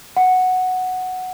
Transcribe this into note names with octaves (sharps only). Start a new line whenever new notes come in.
F#5